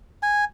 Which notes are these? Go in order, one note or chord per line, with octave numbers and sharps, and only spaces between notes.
G#5